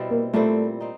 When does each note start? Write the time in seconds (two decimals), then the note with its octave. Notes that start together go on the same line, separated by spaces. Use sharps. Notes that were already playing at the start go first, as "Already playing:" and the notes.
Already playing: B2 G3 C4 E4
0.10 A#3
0.33 A#2 G3 A3 C4 E4
0.81 C4 D#4